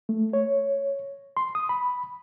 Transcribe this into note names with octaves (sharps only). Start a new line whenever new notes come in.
A3
C#5
C6
D#6
B5